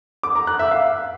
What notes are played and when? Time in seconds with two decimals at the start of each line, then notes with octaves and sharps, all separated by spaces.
0.23 D6
0.35 A#5
0.47 F#6
0.59 E5
0.71 F5